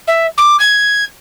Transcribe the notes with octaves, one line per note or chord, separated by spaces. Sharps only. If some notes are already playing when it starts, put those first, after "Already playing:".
E5
D6
G#6